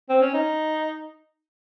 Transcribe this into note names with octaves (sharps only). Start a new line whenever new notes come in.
C4
C#4
D#4